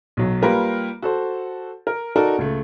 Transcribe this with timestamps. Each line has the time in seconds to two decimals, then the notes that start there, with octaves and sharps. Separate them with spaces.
0.17 B1 F#3
0.42 G3 A#3 F4 G4 A#4 B4
1.02 F#4 A4 C5
1.87 A#4
2.16 D#4 F#4 A4 A#4 D5
2.38 C#2 A3